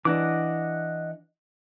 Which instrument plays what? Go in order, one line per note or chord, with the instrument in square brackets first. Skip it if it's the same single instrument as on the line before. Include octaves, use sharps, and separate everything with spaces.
[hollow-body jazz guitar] E3 D4 [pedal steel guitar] D#5 F#5 D6